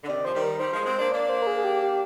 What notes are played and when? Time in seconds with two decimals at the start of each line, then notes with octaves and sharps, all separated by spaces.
0.03 D3
0.07 C3 D#3 D5
0.23 F3 C5
0.33 D#3 G3
0.42 A#4
0.59 D#3 G3 C5
0.72 F3 G#3
0.85 G#3 C4
0.99 A#3 D4
1.12 A#3 D4 D5
1.29 C5
1.42 A#4
1.47 G#4
1.57 G#4
1.64 G4
1.82 G4